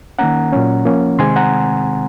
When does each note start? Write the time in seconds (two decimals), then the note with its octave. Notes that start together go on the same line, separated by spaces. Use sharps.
0.19 D#3 A#3 C#4 F#5 A#5
0.52 A#2 F#3 C#4
0.85 F3 A#3 C#4
1.19 C3 D#3 G#3 C4 G#5 C6
1.36 F#5 A#5